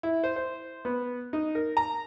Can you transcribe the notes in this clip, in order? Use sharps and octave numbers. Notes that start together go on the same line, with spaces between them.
E4
C5
C5
B3
D#4
A#4
A#5